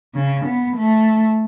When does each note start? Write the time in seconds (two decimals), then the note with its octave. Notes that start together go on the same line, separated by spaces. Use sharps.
0.15 C#3
0.46 B3
0.77 A3